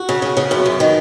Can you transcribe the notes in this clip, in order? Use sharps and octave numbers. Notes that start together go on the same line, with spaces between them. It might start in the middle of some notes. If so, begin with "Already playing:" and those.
Already playing: F#4
C#3
C#3
C#3
F#2 B3
F#2
D#3